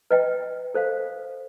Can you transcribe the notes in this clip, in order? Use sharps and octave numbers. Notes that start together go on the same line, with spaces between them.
B4 D#5 G5
A4 C5 F5